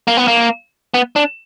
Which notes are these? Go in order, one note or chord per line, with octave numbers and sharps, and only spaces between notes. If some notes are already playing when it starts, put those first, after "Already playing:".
A#3
B3
A#3
B3
D4